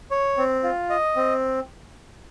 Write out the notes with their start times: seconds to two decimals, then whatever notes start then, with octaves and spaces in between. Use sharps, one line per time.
0.11 C#5
0.37 C4
0.63 F4
0.90 D#5
1.16 C4